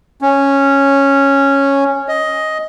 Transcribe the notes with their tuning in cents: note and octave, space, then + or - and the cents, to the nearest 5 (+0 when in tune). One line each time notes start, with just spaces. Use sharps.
C#4 -5
D#5 +10